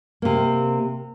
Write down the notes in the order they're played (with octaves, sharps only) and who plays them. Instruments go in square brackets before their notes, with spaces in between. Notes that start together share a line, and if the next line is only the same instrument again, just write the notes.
[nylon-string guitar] C3 A#3